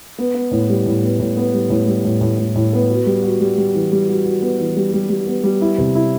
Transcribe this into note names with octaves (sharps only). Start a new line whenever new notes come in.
B3
B3
A2
G3
A2
B3
A2
B3
G3
A2
G3
A2
A2
A2
A2
B3
F#4
G3
F#4
G3
G3
E3
G3
F#4
F#4
B3
E3
G3
G3
G3
B3
G3
E4
C3
E4